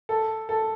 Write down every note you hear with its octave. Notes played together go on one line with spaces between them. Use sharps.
A4
A4